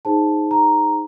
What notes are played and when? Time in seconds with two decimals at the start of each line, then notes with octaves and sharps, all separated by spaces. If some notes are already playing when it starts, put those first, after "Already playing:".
0.05 D#4 G#4 C5 A5
0.51 A#5